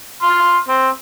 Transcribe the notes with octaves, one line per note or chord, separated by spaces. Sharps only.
C6 F6
C4